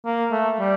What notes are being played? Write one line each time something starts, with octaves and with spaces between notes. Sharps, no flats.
A#3
A3
G3